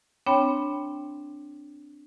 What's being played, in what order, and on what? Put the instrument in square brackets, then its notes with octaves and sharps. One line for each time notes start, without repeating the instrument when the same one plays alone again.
[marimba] C4 D4 C#5 G5 B5